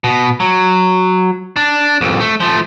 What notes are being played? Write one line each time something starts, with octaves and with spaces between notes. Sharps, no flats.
B2
F#3
D4
C2 F2
A3
F3 A3